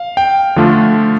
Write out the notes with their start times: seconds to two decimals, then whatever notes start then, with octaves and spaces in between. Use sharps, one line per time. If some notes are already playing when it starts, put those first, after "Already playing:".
Already playing: F5
0.17 G5
0.56 D3 F3 A3 D4 F4